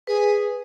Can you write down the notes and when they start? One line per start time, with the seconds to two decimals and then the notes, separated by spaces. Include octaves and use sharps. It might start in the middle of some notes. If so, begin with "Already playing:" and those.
0.07 G#4 B4